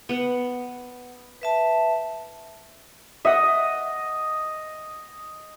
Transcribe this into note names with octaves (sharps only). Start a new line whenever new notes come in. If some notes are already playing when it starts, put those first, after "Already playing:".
B3 F#5
B4 E5 A5
D#5 E5 F#5 D#6